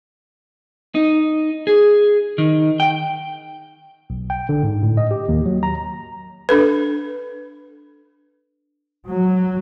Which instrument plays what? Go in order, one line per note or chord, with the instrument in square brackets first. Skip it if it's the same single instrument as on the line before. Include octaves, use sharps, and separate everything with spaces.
[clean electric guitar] D#4
G#4
D#3
G5
[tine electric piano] B1
G5
D3
G#2
A2
D#5
G4
D#2
F#3
A#5
[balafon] D4 A4 B4
[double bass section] F#3